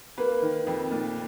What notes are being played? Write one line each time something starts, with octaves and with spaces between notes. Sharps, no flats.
A#3 B4
D#3
F2
A#2